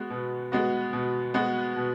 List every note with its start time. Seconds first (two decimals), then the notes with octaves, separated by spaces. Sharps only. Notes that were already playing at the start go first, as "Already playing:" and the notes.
Already playing: G#3 B3 F#4
0.10 B2
0.52 G#3 B3 F#4
0.93 B2
1.34 G#3 B3 F#4
1.76 B2